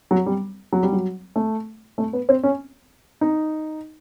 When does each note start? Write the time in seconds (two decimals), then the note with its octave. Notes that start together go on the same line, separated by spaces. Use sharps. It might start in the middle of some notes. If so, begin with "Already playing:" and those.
0.11 F#3
0.26 G3
0.73 F#3
0.83 G3
0.92 F#3
1.36 A3
1.98 A3
2.13 B3
2.29 C4
2.43 C#4
3.21 D#4